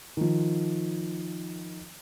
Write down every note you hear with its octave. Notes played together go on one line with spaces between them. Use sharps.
D#3 F3